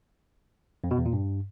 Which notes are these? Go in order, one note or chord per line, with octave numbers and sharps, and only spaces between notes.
F2
B2
E2
A#2
G2